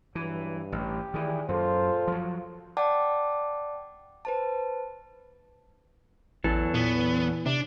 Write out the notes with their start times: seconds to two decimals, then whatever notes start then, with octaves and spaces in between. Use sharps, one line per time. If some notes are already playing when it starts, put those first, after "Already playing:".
0.15 G2 E3 F#3
0.72 A1 G4
1.14 D#3 E3 E4 G#4 D5
1.49 F#2 A#2 F4 A4 C5
2.07 F3 F#3
2.77 D5 F#5 G5 A5 D6
4.25 B4 C5 A5
6.44 A1 E2 E3 F#3 A4
6.74 A#2 B3
7.46 C3 D4